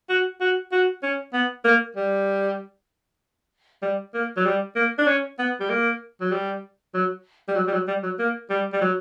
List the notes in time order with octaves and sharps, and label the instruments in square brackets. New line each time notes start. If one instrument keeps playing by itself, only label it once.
[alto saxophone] F#4
F#4
F#4
C#4
B3
A#3
G3
G3
A#3
F#3
G3
A#3
D4
C#4
B3
G3
A#3
F#3
G3
F#3
G3
F#3
G3
F#3
G3
F#3
A#3
G3
G3
F#3